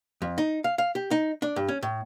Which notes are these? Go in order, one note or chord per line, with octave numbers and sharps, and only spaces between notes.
F2
D#4
F5
F5
G4
D#4
D4
G2
C#4
A2